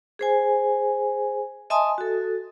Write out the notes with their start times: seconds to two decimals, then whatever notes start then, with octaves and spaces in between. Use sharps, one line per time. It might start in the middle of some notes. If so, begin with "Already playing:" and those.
0.19 G#4 C5 G#5
1.70 D#5 E5 G#5 A5 C6 D#6
1.98 F#4 A4